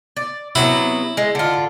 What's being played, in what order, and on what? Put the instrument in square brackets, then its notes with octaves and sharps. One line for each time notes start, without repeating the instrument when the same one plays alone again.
[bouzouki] D5
[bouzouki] C3 F#3 B3 [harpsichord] E4
[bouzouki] G#3
D3 F4